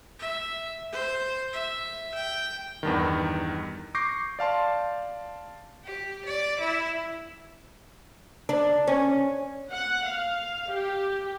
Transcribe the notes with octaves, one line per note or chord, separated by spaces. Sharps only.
E5
C5
E5
G5
E2 G2 D#3
C#6 D6 G6 A#6 C7
D5 F5 A5 C6
G4
D5
E4
D4
C#4
F#5
F5
G4